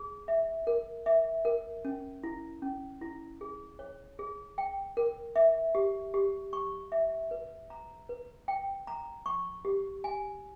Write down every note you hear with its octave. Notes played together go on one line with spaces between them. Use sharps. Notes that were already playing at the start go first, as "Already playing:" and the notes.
Already playing: G#4
E5
A#4
E5
A#4
C#4
E4
C#4
E4
G#4
C#5
G#4
G5
A#4
E5
G4
G4
C#6
E5
B4
A#5
B4
G5
A#5
C#6
G4
G#5